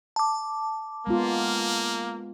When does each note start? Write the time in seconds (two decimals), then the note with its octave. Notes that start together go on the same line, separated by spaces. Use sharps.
0.16 A5 D6
1.07 G#3 A#3 B3 F4